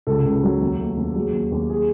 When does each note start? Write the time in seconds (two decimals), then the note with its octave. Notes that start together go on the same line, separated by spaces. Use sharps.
0.07 C#2 A4
0.25 C#2
0.43 F#3
0.61 D#2
0.79 A3
0.97 D#2
1.15 F#3 G#4
1.33 D#2
1.52 D#2
1.70 G#4